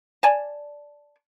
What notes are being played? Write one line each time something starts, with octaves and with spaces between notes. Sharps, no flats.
D5 G#5 A5